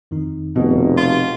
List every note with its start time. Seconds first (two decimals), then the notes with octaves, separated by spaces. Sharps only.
0.11 F2 D#3 D#4
0.56 F1 B2
0.97 F4